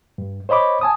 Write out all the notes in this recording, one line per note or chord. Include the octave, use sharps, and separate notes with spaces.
G2
C5 C#5 D#5 B5 D6
G#5 A5 D#6